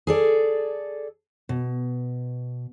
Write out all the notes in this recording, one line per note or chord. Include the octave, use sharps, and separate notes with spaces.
G#4 A4 D5
B2